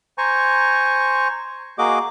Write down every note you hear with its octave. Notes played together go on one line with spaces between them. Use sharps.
C5 G#5 A#5 C#6
A#3 F#4 G#4 D#5 D6